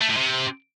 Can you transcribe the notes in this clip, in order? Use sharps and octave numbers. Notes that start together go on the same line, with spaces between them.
A3
A2
C3